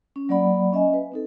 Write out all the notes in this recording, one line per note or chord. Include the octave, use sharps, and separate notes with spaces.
C#4
F#3 A#3 D5 F#5 B5
C#4 D#5 E5 G#5
B4
C4 D#4 A4